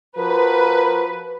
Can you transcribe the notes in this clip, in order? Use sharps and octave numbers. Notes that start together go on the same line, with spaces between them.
F3 F#4 A#4 B4